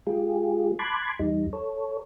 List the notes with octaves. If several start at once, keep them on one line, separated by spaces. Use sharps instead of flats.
G#3 F4 G4 G#4
A5 B5 C6 D6 F#6 G#6
E2 G3 D#4
A4 C#5